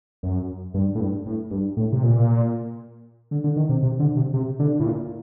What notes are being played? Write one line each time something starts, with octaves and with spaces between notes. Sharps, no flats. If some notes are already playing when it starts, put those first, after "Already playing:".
F#2
G2
A2
G2
A2
G2
A2
C3
A#2
D3
D3
D#3
C3
C3
D3
C3
C3
D3
A2
A#2